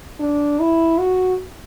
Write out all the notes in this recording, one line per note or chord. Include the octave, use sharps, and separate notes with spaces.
D4
E4
F#4